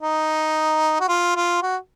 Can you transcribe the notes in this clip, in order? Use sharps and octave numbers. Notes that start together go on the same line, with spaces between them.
D#4
F#4
F4
F4
F#4